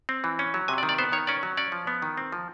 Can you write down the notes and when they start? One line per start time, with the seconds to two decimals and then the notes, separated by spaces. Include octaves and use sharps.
0.09 C4
0.24 E3
0.39 C#4
0.54 F#3
0.68 C3 G#5
0.78 D5
0.83 D#3
0.89 D5
0.98 B3 C5
1.12 D#3 C#5
1.27 C#4 D5
1.43 F#3
1.57 C#4 D5
1.72 F3
1.87 B3
2.02 D#3
2.17 C4
2.32 F3